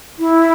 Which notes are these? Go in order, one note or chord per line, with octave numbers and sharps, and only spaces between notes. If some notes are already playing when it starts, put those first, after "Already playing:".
E4